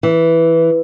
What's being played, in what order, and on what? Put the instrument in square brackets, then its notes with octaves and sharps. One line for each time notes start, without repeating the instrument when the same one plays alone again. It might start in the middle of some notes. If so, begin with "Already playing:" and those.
[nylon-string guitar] E3